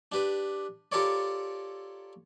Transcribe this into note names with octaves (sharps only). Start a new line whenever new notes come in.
D4 G4 B4
F4 G4 A4 A#4 C#5 D5